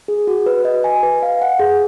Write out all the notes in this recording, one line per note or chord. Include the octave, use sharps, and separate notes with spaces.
G#4
F#4
B4
D#5
G#5
B4
F5
F#5
G#4